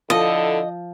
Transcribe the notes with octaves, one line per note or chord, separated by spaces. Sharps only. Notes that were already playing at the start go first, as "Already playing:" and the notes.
D3 F3 E4 A4 D#5